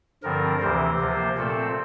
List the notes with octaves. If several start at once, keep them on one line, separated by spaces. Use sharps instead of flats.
G2 D3 F3 C4 A#4
D2 C3 E3 C5
C3 F3 A#3
A#2 A3 C4 A4